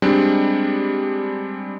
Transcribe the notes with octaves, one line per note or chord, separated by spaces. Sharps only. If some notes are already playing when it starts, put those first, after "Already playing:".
G3 G#3 C4 D4